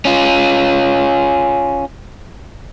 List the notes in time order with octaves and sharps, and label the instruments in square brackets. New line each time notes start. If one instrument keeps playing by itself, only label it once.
[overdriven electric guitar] C#4 F4